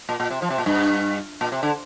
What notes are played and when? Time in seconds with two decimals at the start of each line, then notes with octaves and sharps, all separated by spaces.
0.09 A#2
0.20 A#2
0.30 C3
0.42 F3
0.50 C3
0.58 A#2
0.66 G2
1.41 A#2
1.52 C3
1.63 D3